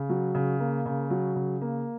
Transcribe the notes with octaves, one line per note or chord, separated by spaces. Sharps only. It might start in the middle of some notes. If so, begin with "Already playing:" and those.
Already playing: C#3
F#3
C#3
A#3
C#3
F#3
C#3
A#3